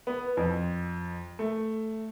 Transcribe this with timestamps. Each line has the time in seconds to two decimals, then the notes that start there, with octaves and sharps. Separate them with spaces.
0.07 B3
0.37 F2
1.39 A3